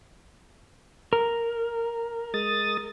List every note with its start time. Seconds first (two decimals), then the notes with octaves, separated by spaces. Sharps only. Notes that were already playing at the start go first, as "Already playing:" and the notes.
1.13 A#4
2.34 G#3 D#6 A6